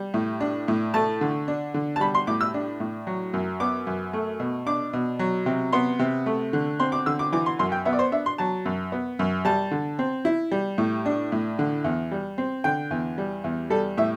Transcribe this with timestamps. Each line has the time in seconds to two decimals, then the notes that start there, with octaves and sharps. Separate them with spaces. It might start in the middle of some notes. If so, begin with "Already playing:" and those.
Already playing: G3
0.14 A2
0.40 D4
0.68 A2
0.94 A3 A5
1.21 D3
1.48 D4
1.74 D3
1.96 A5
2.00 G3 B5
2.15 C6
2.27 A2 D6
2.41 E6
2.54 D4
2.80 A2
3.07 F#3
3.33 F#2
3.60 B3 D6
3.87 F#2
4.13 A3
4.40 B2
4.66 D4 D6
4.93 B2
5.19 F#3
5.46 C3
5.72 B3 C6
5.99 C3
6.26 A3
6.53 D3
6.80 C4 C6
6.92 D6
7.06 D3 E6
7.19 D6
7.32 E3 D6
7.46 C6
7.59 F#2 C6
7.72 G5
7.85 B3 E5
7.93 D5
7.99 C5
8.12 D4 E5
8.26 C6
8.38 F#3 A5
8.65 F#2
8.92 B3
9.19 F#2
9.45 G3 A5
9.71 D3
9.99 C4
10.25 E4
10.52 G3
10.78 A2
11.06 D4
11.32 A2
11.59 D3
11.84 E2
12.12 G3
12.38 C4
12.64 D3 G5
12.91 E2
13.18 G3
13.44 E2
13.70 G3 A4
13.97 A2 E5